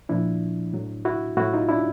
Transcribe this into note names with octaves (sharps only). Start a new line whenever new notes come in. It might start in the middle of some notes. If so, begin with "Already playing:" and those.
A#2 F3 D4 E4
A2 F#3
E4 F#4
A2 F#3 E4 F#4
D#4 F4
D4 E4